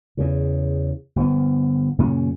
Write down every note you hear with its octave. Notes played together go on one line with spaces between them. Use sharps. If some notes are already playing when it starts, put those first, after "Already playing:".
E2 C#3
G1 F3 B3
F#2 A#2 C#3 C#4